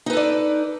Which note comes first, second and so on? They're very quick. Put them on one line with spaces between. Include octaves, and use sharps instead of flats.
D#4 B4 A4 D5